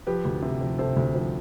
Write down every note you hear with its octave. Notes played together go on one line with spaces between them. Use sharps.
F3 G4 B4
D2
C3
F3
C3 A4 C5
D2
F3